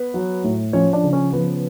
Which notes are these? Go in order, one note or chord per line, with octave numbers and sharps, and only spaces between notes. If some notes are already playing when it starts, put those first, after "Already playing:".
Already playing: B3 B4
F#3
A2
F3 C#4 C#5
D4 D5
C#3
C#4 C#5
F3 B3 B4